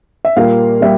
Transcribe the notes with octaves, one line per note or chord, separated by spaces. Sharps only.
E5
A#2 G3 A#3 F5
G3 A#3 E5